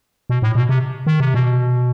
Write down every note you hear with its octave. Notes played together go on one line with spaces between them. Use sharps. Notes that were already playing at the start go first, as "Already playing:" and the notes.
B2
A2
B2
C3
D#3
C3
B2